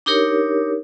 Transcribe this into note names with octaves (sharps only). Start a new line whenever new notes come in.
D4 D#4 G4 A#4 C#5